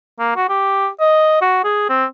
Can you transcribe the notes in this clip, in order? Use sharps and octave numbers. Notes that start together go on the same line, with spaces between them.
A#3
F#4
G4
D#5
F#4
G#4
C4